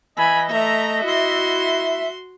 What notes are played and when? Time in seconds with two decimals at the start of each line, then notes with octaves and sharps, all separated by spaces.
0.17 E3 D#5 G#5 B5
0.50 A3 E5 A#5
1.03 E4 F#4 C6